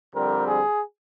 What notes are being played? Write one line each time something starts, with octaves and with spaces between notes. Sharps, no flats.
F2 D3 G3 C4 A#4
G#4